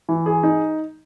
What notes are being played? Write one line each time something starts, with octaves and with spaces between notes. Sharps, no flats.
E3
G#4
D#4